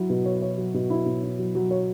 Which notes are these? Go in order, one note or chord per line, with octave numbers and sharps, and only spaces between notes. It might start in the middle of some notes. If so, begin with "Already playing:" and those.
Already playing: F#3 E4
B2
C#5
C#5
F#3
B2
E4
B2
E4
F#3
F#3
C#5